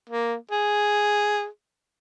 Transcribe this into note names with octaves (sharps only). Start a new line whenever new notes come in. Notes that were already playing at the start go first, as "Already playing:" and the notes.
A#3
G#4